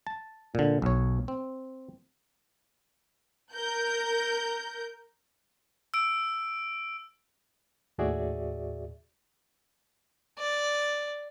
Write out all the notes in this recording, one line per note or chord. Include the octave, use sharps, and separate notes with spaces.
A5
A#2 D3
B1 C#5
C4
A#4 G6
E6 D7
D#2 A2 F#4 G#4 D5 E5
D5